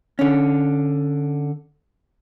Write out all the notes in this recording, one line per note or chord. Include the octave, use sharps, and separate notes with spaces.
D3 C#4